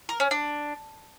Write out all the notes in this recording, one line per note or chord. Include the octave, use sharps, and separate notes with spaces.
A#4
C#4
D4